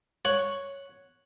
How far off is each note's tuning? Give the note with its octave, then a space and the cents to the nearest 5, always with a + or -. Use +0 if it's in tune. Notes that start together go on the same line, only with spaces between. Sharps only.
C#5 +0 F#5 +0